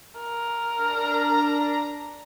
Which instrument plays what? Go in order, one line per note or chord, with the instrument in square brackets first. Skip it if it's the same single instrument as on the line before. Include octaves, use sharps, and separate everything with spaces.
[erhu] A#4
[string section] D4 A#5